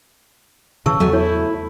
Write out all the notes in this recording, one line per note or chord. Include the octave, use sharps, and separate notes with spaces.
A2 C#3 E3 A5 C#6 E6
E2 F#3 A3 G#5
E4 C#5